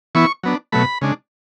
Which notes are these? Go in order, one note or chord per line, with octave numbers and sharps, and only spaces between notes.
E3 B3 E4 C#6
F#3 B3 D4
B2 F#3 A3 B5
C#3 G#3 D4